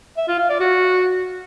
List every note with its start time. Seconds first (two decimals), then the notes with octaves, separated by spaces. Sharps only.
0.18 E5
0.28 F4
0.39 F5
0.49 D5
0.60 F#4